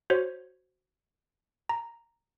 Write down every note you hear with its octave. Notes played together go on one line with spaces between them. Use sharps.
F#4 C5 C#5
A#5